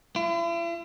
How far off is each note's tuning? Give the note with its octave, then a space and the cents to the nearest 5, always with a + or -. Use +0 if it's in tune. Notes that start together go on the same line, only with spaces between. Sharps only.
E4 +45